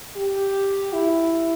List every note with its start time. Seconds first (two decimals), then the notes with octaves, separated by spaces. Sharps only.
0.16 G4
0.93 E4